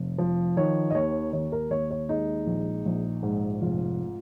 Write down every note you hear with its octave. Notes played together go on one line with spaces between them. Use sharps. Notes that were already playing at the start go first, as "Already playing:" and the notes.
Already playing: F1
F3
D#3 C#5
D#5
D#2 C#5
D#2 C#5
A#4
D#2 C#5
C#5
G#3 D#4
A#1
A#1
G#2
F1 F4